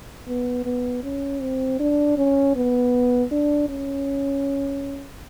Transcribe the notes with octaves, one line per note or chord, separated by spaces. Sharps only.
B3
B3
C#4
C4
D4
C#4
B3
D4
C#4